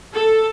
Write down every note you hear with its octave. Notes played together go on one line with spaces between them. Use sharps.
A4